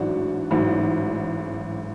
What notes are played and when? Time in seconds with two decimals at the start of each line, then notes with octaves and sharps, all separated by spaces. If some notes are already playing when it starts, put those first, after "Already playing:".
Already playing: A1 G#2 F#3 D4 F#4
0.51 A1 G#2 F#3